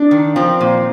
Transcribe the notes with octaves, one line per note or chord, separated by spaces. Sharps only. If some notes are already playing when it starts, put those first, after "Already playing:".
Already playing: D4
D#3
F3 C4
A#2